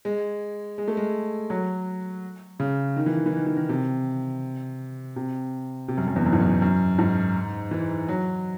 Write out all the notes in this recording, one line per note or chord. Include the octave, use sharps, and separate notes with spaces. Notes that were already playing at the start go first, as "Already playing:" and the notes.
G#3
G#3
A3
G#3
F#3
C#3
D#3
E3
D#3
E3
D#3
E3
D#3
C3
C3
C3
F#2
F#2
E2
F#2
G#2
F#2
F#2
G#2
E3
F#3